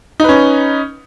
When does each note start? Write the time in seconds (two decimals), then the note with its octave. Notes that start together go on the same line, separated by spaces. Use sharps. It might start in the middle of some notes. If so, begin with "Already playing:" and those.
0.20 D#4
0.24 B4
0.29 C#4